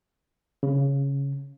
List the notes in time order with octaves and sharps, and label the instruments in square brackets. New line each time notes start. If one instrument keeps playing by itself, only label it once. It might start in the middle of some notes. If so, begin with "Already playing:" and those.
[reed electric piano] C#3